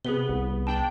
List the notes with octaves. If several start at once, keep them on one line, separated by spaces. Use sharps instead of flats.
C3 B3 G#4 B4 G7
C2
D4 G5 A5